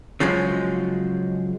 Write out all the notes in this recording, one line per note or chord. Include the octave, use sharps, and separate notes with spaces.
C#3 F3 F#3 G#3